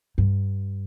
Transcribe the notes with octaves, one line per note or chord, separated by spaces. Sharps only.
G2